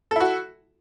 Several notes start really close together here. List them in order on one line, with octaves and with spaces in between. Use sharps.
A4 E4 F#4